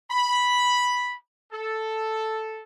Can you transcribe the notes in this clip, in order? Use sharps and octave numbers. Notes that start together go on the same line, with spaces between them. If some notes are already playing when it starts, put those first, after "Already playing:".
B5
A4